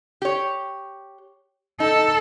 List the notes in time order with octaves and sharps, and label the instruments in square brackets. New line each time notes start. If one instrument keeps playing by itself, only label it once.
[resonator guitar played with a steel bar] G4 C#5
[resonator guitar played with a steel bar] D#4 [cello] A4